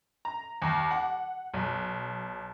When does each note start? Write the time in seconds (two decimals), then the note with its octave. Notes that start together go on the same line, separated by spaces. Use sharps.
0.25 A#5
0.62 D#2
0.91 F#5
1.54 B1